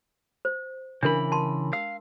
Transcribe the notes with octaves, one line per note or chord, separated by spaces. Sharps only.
C5
C#3 E3 D4 A#4 B5
A5 C6
F5 E6